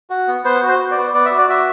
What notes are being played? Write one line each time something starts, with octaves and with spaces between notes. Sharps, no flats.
F#4
B3
B3 C5
F#4
C5
F#4
D5
B3
B3 D5
E5
F#4
D5
F#4 E5